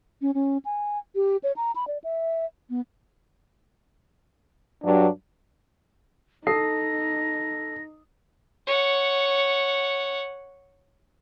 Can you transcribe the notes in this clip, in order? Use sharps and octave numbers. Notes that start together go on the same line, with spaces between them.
C#4
C#4
G#5
G4
C#5
A#5
B5
D5
E5
B3
G2 F#3 D4
D#4 A4 D#6 A#6 C7
C#5 F#5